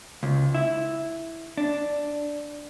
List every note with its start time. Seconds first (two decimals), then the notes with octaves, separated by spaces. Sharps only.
0.23 C#2
0.55 E4
1.58 D4